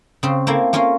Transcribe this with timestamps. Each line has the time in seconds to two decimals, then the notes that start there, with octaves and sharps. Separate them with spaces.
0.23 C#3 C4
0.47 A3 A#3 C4 E4
0.73 A#3 C#4 F4 A#4 F5